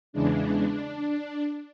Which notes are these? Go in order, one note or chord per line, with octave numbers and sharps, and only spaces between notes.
E2 C#3 E3 G#3 D4